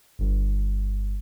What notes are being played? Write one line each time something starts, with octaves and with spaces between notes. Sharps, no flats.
G1